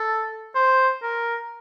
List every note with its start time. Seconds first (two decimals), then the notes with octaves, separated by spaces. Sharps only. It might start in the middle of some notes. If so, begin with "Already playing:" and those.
Already playing: A4
0.55 C5
1.03 A#4